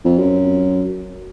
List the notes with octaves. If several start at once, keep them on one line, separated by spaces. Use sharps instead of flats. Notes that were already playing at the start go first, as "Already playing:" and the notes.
F2
F#2